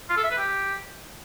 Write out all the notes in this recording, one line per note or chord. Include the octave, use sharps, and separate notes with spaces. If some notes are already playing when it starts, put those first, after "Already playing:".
F4
A4
E5
B4
G4